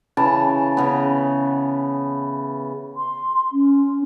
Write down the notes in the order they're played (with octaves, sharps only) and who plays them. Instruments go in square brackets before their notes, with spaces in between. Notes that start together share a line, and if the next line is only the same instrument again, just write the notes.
[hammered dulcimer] C#3 E3 A5
C#3 B3
[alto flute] C6
C#4